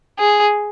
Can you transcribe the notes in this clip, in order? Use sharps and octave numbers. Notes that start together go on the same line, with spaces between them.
G#4